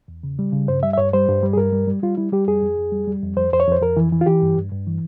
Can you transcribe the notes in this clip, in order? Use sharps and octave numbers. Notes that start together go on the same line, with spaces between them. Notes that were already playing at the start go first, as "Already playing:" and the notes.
E2
C#3
G3
C#3
G2 C5
G3 E5
E5
G2 C#5
G3 C5
G2
G3
G#4
G2 A#4
G3
G3
G3 F4
G3 E4
G3 G4
F2 G#4
F2
F2
G3
G3
F2
F2 C5
F2 C5
C#5
F2 C5
F2 A#4
E3
E3
F4
E3 G4
G2
G2
G2
E3